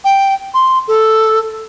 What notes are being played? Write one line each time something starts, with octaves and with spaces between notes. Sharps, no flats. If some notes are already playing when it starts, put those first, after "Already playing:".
G5
C6
A4